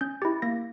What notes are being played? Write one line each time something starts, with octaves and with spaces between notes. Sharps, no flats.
C#4 G6
E4 G4 A6
A#3 A#6